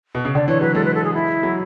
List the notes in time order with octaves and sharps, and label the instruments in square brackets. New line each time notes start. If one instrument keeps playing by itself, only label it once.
[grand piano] B2
C#3
[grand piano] D3 [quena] D5
[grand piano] E3 [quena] C#5
[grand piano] F#3 [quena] B4
[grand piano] G#3 [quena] A4
[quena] B4
A4
G#4
E4
[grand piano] F#3